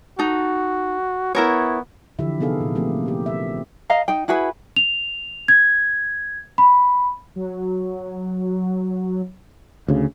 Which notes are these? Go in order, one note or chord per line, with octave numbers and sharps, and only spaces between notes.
D#4 F#4 A4
B3 E4 A#4 C#5
D3 E3 F3 E4 G4 E5
C3 B3 D#4 G#4 A4 F5
A#2
F3 A3 A#3 C4 G4
G4 A#4
E5
D#5 F5 A#5
D#4 G5
E4 F#4 G#4 B4
F7
G#6
B5
F#3
D2 C#3